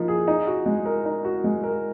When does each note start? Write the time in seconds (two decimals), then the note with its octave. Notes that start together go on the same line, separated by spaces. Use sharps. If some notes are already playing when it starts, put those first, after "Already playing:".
Already playing: F3 A#3 D#4
0.08 G#4
0.28 D#4
0.47 F#4
0.66 G#3
0.86 A#4
1.05 D#4
1.25 F#4
1.44 G#3
1.63 A#4